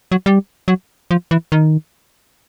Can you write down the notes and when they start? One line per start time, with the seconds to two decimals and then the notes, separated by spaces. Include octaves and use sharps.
0.12 F#3
0.26 G3
0.68 F#3
1.11 F3
1.31 E3
1.52 D#3